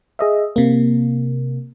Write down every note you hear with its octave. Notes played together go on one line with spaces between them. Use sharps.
G#4 D#5 E5
C3 A#3